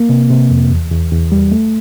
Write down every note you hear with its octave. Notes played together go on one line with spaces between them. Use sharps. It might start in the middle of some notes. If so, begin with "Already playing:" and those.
Already playing: A#3
C3
C3
F2
E2
E2
E2
G3
A3